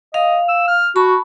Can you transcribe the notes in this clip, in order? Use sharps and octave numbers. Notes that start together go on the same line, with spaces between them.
D#5 F5
E6
F6
F#4 A5 B5 C#6